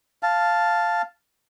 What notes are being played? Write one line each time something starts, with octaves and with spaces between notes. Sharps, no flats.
F5 A5